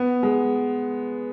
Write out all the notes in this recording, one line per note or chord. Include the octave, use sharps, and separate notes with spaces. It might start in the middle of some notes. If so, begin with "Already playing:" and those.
Already playing: B3
G#3